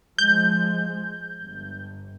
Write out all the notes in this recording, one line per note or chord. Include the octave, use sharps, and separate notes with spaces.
F3 G#3 G6
G1